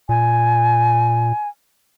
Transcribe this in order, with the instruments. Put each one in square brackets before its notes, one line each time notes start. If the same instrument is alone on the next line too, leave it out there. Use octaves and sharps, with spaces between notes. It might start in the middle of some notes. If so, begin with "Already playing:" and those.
[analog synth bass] A#2 [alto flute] G#5